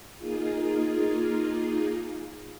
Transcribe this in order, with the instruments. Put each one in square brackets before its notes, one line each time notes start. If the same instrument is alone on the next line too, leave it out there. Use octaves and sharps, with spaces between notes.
[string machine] A#3 D#4 F4 G#4